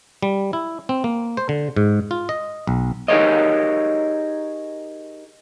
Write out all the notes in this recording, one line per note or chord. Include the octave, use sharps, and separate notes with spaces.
G3
E4
C4
A#3
C5
D3
G#2
F4
D#5
B1
D#4 G4 G#4 A#4 C#5 D#5